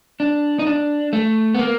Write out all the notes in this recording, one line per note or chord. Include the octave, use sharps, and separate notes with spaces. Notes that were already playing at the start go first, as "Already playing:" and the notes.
D4
D#4
D4
A3
B3
A#3